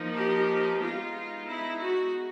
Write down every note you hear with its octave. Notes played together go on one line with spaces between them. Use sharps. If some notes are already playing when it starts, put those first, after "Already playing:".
Already playing: F3 A#3 D#4
G4
G#3 B3 D#4 F4
E4
F#4